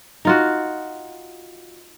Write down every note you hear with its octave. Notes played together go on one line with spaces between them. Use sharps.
D#4 F4 F#4